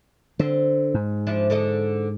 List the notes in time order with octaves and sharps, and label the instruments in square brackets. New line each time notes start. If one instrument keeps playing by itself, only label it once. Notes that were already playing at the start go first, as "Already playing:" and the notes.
[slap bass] D3 [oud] C4
[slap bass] G#2
[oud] F3 D4 E4
D3 A4 D#5